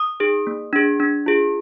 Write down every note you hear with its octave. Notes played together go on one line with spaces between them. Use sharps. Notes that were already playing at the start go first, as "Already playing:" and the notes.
Already playing: D#6
D#4 G#4
A#3
D4 G#4
D4
F4 G#4